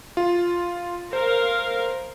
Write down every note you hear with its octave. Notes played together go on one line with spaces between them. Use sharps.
F4
A#4 C5 F5